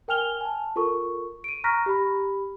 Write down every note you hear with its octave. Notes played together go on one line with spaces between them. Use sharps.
A#4 G5 G#5 F6 F7 G7
G#5 A5
F4 A4 A#4 C#6
D7 D#7
A#5 C#6 F6 F#6 A#6 B6
G4 B5